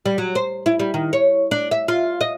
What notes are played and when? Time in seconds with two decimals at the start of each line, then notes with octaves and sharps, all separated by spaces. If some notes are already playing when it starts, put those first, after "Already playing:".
0.06 G3
0.18 F#3
0.35 C5
0.66 E4
0.79 G3
0.94 D#3
1.13 C#5
1.51 D4
1.71 E5
1.88 F4
2.21 D#5